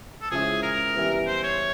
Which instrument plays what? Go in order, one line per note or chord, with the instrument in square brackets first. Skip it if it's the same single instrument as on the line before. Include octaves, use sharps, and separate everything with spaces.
[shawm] A4
[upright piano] C#3 F3 G#3 C#4 E4 [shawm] G#4
[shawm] A#4
[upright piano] E3 G3 B3 E4
[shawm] C5
C#5